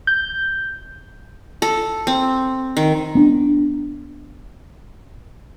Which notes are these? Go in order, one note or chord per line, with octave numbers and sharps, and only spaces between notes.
G6
A4
C4
D#3
B3 D4